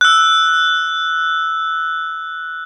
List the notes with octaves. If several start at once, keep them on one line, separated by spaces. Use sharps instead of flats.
E6 F#6